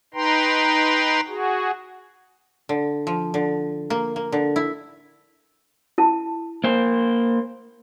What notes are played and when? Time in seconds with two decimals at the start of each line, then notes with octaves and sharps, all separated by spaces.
0.14 D#4 B4 G5 A#5 C6
1.28 F#4 G#4
2.69 D3
3.07 F3
3.34 D3
3.90 A#3
4.16 A#3
4.32 D3
4.56 E4
5.98 E4 A5
6.64 A#3 C5